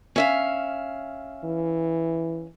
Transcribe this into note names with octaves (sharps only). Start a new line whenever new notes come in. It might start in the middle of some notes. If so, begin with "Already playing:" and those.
C#4 E5 F5
E3